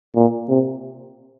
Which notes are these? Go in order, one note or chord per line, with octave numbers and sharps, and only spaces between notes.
A#2
C3